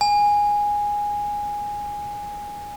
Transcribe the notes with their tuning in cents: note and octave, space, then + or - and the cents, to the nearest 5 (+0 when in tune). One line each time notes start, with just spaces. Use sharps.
G#5 -10